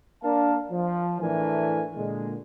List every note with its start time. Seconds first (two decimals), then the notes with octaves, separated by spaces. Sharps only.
0.22 A#3 D4 A#4 F5 A5
0.71 F3
1.21 A2 E3 A3 D4 A#4 G#5
1.96 A#2 D3 G#3